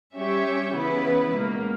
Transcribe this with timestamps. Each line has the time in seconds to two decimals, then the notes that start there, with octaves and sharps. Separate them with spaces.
0.16 G3 C#4 G4 C#5 E5
0.73 C#3 E3 B3 E4 B4
1.32 C#2 B2 A#3